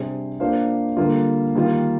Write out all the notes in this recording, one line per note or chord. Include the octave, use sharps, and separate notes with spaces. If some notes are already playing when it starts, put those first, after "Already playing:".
Already playing: C3 G3 D4 G#4 C5
A#3 D4 F4 C5 F5
D3 G3 A#3 F4
D#3 G3 A#3 F4